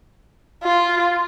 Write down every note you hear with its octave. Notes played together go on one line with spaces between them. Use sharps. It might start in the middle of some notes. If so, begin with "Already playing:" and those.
F4